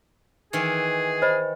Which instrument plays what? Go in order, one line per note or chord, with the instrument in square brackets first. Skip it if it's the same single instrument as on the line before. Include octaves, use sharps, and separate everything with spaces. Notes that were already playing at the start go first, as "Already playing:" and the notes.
[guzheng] D#3 E3 [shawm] G#4
[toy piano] C5 D#5 B5